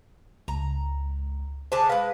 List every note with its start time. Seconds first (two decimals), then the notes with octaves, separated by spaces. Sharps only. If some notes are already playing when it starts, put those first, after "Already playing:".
0.48 C#2 A#5
1.72 D3 G#4 C5 A5
1.89 G#3 B4 F5